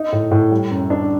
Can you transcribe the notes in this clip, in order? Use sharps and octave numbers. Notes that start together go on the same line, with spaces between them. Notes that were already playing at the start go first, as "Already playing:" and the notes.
Already playing: D#4
A2
A2
G3
F#2
D4